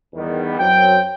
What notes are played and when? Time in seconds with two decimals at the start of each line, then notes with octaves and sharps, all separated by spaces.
0.13 E2 D#3 G3 B3
0.57 F#2 F#3 C4 G5